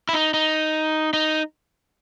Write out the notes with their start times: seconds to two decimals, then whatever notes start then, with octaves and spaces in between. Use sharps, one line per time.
0.09 E4
0.13 D#4
0.34 D#4
1.13 D#4